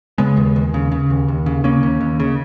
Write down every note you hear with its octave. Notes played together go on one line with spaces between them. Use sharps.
C#3 G#3 B3
D#2
D#2
C#3
C#3
D#2
D#2
C#3
C#3 A#3 C#4
D#2
D#2
C#3